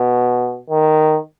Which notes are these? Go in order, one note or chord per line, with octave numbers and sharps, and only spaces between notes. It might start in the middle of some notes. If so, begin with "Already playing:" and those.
Already playing: B2
D#3